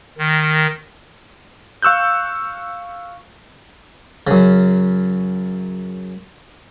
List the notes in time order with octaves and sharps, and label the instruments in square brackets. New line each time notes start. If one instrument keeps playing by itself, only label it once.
[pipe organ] D#3
[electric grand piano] F5 C#6 E6 F#6 G6
[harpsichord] F#2 C#3